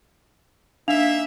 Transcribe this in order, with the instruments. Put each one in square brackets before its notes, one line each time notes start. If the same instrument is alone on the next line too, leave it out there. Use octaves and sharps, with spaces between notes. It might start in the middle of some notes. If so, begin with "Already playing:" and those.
[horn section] A#3 D#4 E5 [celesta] D4 F5 F7